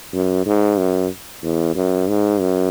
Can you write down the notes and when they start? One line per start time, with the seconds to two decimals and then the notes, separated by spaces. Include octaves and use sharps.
0.13 F#2
0.46 G#2
0.78 F#2
1.43 E2
1.75 F#2
2.08 G#2
2.40 F#2